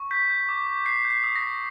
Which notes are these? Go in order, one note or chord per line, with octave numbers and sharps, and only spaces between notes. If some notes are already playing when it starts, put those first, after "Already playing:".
Already playing: C#6
G6 B6
G6
D6
D6
G6 C7
G6
C7
D#6
A#6
D#6